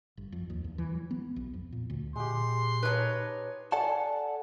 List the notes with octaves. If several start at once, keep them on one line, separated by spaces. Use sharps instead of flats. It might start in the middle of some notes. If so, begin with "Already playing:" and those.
G1
F2
D#2
E2
E3
F#3
B3
B1
F2
A#2
D2
A#2 G#3 G4 C6
D#4 B4 C#5 D#5 A5
A4 D5 F#5 G#5 A5